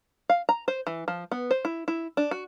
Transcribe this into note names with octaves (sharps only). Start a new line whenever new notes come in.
F5
A#5
C5
E3
F3
B3
C5
E4
E4
D4
F#4